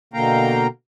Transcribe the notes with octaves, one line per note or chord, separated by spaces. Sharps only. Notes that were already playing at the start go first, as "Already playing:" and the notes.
B2 D3 A#3 F5 G5 A#5